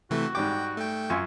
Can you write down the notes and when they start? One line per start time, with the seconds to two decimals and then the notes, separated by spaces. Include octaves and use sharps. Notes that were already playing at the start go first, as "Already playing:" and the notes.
0.10 C3 E3 A3 F#4
0.35 G#2 G3 G5 D6
0.77 A3 G5
1.10 F#2 F4 G#5 C#6